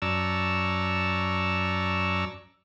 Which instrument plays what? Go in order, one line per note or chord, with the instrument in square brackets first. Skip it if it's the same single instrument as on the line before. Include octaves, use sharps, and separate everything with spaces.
[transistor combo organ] F#2 D5 A5 A#5 C#6 E6